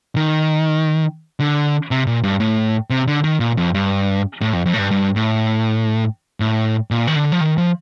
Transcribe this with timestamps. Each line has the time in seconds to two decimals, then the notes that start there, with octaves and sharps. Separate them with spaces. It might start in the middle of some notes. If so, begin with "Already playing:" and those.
0.16 D#3
1.40 D3
1.91 C3
2.07 A#2
2.23 G2
2.40 A2
2.90 C3
3.07 D3
3.24 D#3
3.40 A#2
3.57 F2
3.74 G2
4.41 A2
4.53 F2
4.66 F2
4.74 A2
4.78 G2
4.91 G2
5.16 A2
6.40 A2
6.91 A#2
7.07 D#3
7.16 D3
7.32 F3
7.41 D#3
7.58 F3